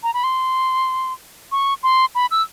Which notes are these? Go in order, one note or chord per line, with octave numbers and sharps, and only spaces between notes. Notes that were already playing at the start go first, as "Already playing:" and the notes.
A#5
B5
C6
C#6
C6
B5
E6